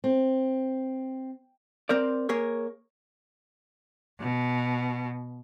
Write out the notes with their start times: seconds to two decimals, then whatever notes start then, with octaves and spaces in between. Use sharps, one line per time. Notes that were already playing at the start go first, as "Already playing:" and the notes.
0.04 C4
1.89 C4 A#4 C5 D5
2.29 A#3 G#4 A#4 C#5
4.20 B2